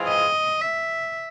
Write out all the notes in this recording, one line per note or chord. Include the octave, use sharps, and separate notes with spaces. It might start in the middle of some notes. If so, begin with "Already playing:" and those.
Already playing: E3 G#3 C4 F4 G#4
D#5
E5